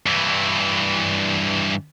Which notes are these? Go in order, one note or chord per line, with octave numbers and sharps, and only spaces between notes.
G2 E3